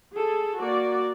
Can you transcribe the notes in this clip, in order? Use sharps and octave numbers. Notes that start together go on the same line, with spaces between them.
G#4 A4
A#3 F#4 D5